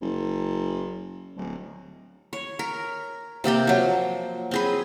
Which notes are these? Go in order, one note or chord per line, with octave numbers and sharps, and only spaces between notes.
F#1
D1
C#5
A#4
C3 A#3 G4 G5
F3 F#3
C4 G#4 B4